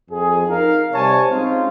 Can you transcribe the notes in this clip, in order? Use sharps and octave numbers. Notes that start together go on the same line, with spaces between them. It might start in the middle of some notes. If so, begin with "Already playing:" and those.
F2 G#4
D#4 A#4 F5
C3 G3 C5 C#5 G#5 A5
G#3 C4 C#4 D#4 F4